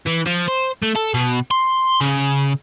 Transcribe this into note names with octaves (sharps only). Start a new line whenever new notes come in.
E3
F3
C5
A3
A4
B2
C6
C#3